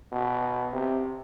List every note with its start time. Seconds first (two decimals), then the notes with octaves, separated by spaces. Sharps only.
0.12 B2
0.73 C3